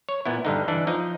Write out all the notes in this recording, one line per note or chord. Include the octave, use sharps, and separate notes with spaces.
C#5
A#2 B3 E4
G2 D3 D#4
E3 D4
F3 D#4